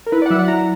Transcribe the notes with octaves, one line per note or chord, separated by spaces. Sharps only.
A#4
E4 B4
D5
F#5
F#3 E5
F#5
E4 A#5